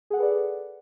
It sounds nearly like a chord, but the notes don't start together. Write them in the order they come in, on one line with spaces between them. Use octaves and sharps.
G#4 F#5 A4 B4 D5